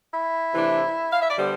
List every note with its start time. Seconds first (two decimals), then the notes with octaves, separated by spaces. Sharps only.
0.13 E4
0.54 C3 E3 A3 D4
1.13 F5
1.21 E5
1.29 D5
1.38 D3 G3 B3 C5